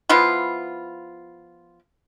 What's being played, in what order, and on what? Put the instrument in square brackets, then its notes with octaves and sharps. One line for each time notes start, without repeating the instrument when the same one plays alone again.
[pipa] F3 B3 E4 F4